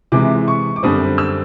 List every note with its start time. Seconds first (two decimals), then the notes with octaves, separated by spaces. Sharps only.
0.12 C3 E3 G#3 D6
0.48 C#6
0.76 D6
0.83 F#2 D3 G3 C4 D#6
1.18 E6